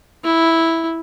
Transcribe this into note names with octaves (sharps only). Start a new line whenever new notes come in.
E4